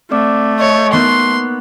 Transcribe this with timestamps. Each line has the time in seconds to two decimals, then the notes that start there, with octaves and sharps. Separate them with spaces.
0.11 A3 C4 D5 D6
0.59 C#5 D#5
0.93 A#3 B3 D#4 C6 C#6 F#6